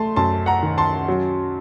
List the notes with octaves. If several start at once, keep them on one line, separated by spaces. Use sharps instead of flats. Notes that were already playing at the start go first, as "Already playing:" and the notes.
Already playing: A3 A5 C6
F#2 A5 C6
F#5 A#5
D#3
A5 C6
F#3